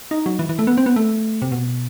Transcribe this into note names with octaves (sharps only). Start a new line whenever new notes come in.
D#4
F#3
E3
E3
A3
B3
C4
B3
A3
C3
B2